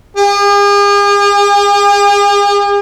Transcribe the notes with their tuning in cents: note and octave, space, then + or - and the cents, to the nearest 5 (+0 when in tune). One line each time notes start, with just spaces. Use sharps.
G#4 -45